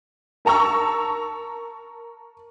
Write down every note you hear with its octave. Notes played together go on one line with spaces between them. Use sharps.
A#4 A5 A#5 C#6 E6